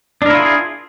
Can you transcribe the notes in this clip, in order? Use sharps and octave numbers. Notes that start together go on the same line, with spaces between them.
D4 E4 F4 G#4 A#4